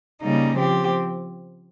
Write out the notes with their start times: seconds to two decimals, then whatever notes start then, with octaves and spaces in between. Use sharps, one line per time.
0.23 C#3 G3 A#3 D#4
0.57 F3 C4 G4